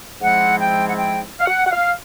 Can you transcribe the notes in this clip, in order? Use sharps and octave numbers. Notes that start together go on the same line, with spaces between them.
G#2 F3 G#3 C4 E4 F#5
G5
F#5
G5
F5
F#5
F#5
F5